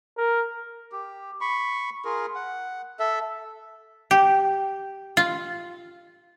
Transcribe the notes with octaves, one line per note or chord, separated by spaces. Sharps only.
A#4
G4
B5 C#6
F4 G#4 A#4
F#5
A4 E5
G4
F4